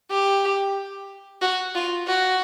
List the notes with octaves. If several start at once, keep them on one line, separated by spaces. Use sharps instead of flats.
G4
F#4
F4
F#4